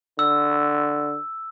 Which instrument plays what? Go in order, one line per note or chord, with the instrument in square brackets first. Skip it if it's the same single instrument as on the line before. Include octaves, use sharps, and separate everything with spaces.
[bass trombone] D3 [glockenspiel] E6